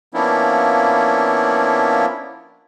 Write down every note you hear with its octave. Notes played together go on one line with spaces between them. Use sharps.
F3 A#3 B3 C#4 D4 E4